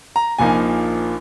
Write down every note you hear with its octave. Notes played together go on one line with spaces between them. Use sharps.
A#5
A#1 A#2 F3 A#3 D#4 G#5